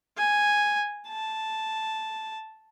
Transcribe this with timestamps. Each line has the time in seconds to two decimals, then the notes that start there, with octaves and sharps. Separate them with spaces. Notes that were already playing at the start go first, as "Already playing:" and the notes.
0.18 G#5
1.08 A5